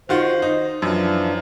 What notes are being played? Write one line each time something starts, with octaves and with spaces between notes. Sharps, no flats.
D#3 F4 F#4 C5
D#4
F#2 E3 F3 D4